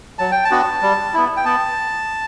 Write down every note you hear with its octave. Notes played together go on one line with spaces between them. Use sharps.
F#3 A5
G5
A5
B3 D4 F#4
G3
B3 E4
G5
B3 A5